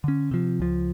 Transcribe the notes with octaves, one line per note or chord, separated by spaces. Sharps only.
D3 C#4
C3 F3
C#2 F3